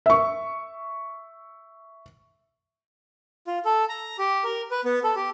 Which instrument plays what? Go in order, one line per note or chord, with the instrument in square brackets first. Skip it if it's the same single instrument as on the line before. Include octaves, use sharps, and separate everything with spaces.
[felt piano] E5 C#6
[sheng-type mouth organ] F4
A4
A#5
G4
A#4
B4
B3
A4
G4